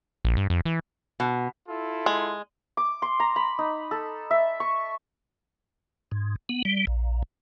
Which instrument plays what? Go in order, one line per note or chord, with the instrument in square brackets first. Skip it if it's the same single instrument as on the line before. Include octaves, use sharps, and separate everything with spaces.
[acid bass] A#1
G2
F2
E3
[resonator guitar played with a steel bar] B2
[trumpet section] E4 F4 A4
[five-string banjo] G#3
[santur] D6
C6
A#5
B5
D#4
A4
E5
C#6
[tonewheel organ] G#2
B3
G3
A#1